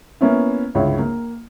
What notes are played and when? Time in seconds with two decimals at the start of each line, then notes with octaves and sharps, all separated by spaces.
0.21 A#3 B3 C#4 E4
0.74 G1 C#2 E4 C#5
0.99 A#3